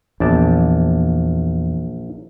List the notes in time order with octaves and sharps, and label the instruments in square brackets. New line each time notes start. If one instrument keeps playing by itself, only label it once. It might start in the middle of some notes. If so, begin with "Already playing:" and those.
[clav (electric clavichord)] A#1 D5 A5 [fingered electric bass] E2